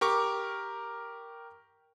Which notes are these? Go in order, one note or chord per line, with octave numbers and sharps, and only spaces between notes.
G4 A#4 C#6 D6